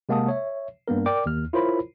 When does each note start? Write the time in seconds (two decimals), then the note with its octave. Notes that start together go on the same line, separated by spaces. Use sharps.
0.09 C3 G#3 A#3 F#5 A5 D#6
0.28 C#5 E5
0.88 G2 A#3 B3 A#4
1.06 A#4 D5 G5 D6
1.26 D#2 F6
1.53 E4 F4 A#4 C5 C#5 B5